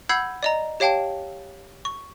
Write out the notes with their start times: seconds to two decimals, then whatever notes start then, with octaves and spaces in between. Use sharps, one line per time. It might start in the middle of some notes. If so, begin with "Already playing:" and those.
0.09 F#5 B5 E6 G6 G#6 C7
0.43 D5 D#5 A#5
0.80 G4 C#5 F5 G5 A5
1.85 C#6